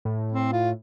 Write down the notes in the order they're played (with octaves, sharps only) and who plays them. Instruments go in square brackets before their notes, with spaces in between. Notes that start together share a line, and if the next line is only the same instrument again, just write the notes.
[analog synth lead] A2
[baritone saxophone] C4
F4